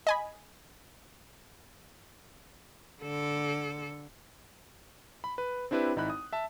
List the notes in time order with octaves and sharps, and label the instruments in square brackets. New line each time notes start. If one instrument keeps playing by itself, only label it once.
[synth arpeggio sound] D#5 G#5 B5
[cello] D3 A4
[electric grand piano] B5
B4
C4 D4 E4 G4 B4
G#1 D#4 E4 B5 F#6
D#6
E5 A5